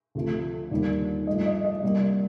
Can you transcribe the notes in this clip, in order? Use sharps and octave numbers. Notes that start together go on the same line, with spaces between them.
D2 C3 F3 A3
D#2 D3 G3 A#3 D5
G2 F3 A3 D#5
D#5
D#5
C2 C3 G3 A#3 D5